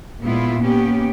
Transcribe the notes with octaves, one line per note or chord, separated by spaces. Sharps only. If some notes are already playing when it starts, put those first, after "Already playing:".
A#2 G#3 B3 E4 F4
A#3 B3 C#4 G4